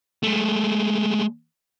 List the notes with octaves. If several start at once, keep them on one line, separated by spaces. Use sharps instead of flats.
G#3 A3